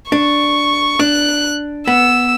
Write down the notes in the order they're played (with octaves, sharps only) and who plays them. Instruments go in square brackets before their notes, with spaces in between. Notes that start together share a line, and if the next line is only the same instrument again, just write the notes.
[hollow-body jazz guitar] D4 [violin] C#6
[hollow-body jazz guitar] D4 [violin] F#6
[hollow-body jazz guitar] B3 [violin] E6